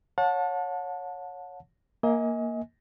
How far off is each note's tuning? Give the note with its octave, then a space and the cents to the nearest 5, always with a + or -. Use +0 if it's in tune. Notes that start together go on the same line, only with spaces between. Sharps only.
C#5 +0 F#5 -40 A5 +0
A#3 +0 D#5 +35 G#5 +0